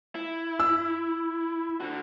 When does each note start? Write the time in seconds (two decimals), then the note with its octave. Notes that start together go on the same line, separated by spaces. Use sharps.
0.15 E4
0.59 E6
1.81 D3 F#4